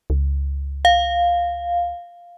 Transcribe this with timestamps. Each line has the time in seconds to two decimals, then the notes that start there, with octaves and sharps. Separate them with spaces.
0.10 C#2
0.85 F5